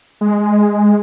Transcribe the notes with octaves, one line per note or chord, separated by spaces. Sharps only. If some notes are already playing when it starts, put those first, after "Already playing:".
G#3